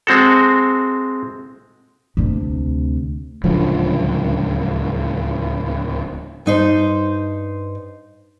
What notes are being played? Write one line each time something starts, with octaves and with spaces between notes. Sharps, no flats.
G#3 C4 F#4 A4
D2 C3
D1 C#2 D3 F3
G2 D#4 C5